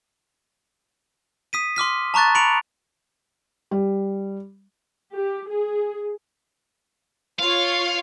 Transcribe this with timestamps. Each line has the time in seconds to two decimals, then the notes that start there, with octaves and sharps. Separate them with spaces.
1.53 D#6 B6 D#7
1.76 C6 D6 F6 B6
2.14 A5 A#5 C#6 F#6 A6
2.35 B5 C#7 D7 F7
3.71 G3
5.15 G4
5.50 G#4
7.39 F4 C#5 F5